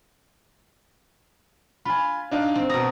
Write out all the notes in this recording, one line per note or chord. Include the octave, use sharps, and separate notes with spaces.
F4 G#5 B5
D4 D#4 F5
C4
B2 A#5 D#6